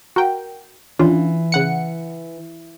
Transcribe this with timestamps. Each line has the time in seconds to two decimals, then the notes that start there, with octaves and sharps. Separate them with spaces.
0.16 F#4 A#4 G5
0.99 E3 C#4 D4 F4
1.52 C#3 F#5 C#7